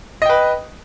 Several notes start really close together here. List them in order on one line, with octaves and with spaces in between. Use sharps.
D#5 G5 B4